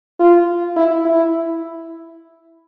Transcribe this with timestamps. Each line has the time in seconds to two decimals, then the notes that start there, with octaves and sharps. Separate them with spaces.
0.20 F4
0.77 E4
1.05 E4